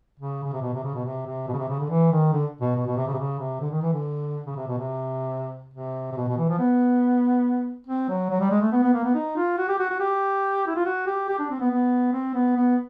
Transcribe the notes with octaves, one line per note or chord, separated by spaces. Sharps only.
C#3
C#3
C3
B2
C3
C#3
B2
C3
C3
B2
C#3
C3
C#3
D3
E3
D#3
D3
B2
B2
B2
C3
C#3
C3
C#3
C3
D3
D#3
E3
D3
C#3
C3
B2
C3
C3
C3
B2
B2
E3
F3
B3
C4
F#3
F#3
G3
G#3
A3
B3
B3
A#3
B3
D#4
F4
F#4
G4
F#4
F#4
G4
E4
F4
F#4
G4
G4
D4
C4
B3
B3
C4
B3
B3